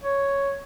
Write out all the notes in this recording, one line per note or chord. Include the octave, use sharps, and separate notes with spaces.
C#5